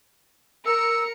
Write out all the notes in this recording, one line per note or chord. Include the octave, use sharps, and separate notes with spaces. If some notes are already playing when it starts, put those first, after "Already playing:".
A#4 E6 C#7